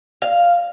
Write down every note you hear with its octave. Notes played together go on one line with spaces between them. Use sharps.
F5